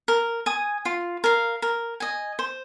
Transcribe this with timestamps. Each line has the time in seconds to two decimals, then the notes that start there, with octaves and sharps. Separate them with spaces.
0.08 A#4
0.46 G#5 D#6
0.85 F4
1.24 A#4 F5
1.62 A#4
2.00 D#5 G#5
2.39 C5